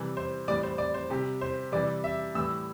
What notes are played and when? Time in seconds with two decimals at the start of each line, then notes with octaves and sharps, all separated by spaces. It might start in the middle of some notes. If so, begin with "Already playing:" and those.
Already playing: C3 E3 G3
0.17 C5
0.48 A2 E3 G3 D5
0.63 C5
0.78 D5
0.94 C5
1.10 C3 G3 G4
1.41 C5
1.72 C3 E3 G3 D5
2.04 E5
2.35 A2 E3 G3 E6